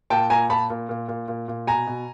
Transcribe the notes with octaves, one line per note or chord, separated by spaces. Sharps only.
A#2 G5 A5
A#2 G#5 A#5
A#2 A5 B5
A#2
A#2
A#2
A#2
A#2
B2 G#5 A#5
B2